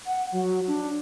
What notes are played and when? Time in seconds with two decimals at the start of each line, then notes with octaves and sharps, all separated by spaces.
0.06 F#5
0.32 F#3
0.68 D4